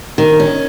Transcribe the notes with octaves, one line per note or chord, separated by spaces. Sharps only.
D#3
C#4